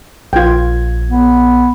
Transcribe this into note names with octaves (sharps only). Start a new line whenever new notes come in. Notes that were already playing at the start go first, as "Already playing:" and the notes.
A#1 F4 G5 G#6
B3